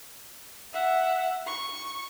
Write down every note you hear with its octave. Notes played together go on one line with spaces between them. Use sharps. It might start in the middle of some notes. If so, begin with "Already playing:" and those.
E5 F#5
C#6